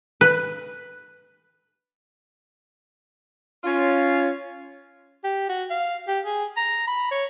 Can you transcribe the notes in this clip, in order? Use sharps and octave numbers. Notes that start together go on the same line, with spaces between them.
B4
C#4 F4
G4
F#4
F5
G4
G#4
A#5
B5
C#5